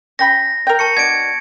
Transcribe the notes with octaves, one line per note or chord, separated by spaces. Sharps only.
C#4 G5 B5 A#6
A#4 G5
A5 C#6 C#7
B2 D4 G#6 D7